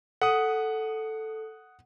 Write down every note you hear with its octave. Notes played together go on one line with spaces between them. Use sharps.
A4 F#5 D#6